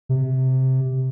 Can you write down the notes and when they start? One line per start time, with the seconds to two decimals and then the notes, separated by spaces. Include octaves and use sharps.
0.09 C3